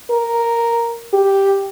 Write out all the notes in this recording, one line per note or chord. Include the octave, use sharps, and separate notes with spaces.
A#4
G4